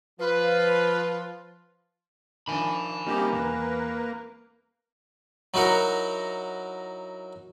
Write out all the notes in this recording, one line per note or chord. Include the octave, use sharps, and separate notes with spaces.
F3 F4 B4
D#3 F3 D4 G#5 B5
G3 A#3 C4 C#4 D#4 G4
E2 B4
F#3 D#4 E4 A#4 F#5